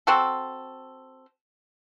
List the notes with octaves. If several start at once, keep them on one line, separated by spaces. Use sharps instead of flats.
C4 F#4 A4